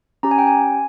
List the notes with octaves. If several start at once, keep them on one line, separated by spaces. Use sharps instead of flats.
C#4 G4 A#5
G#5
G5
G#5